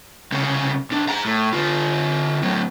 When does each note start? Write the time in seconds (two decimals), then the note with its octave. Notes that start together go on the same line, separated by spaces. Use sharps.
0.32 C2 C#3
0.91 B1 D4
1.09 G#4 A#5
1.25 A2
1.53 D3 F4
2.42 A2 F#3